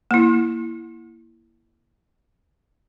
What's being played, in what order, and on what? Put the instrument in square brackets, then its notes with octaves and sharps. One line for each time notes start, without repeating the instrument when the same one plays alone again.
[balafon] A#3 E4